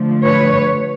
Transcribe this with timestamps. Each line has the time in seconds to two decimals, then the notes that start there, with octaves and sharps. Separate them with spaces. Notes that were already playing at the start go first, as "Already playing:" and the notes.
Already playing: D3 F3 A3
0.24 B4 C#5